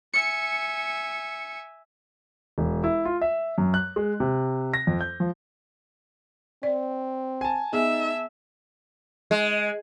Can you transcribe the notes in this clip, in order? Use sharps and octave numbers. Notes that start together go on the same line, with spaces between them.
E5 G#5 C#7
E1
E4
F4
E5
F#2
F#6
G#3
C3
A#6
F2
G6
F3
C4 D5
G#5 A5
B3 D#4 G#4 E5
G#3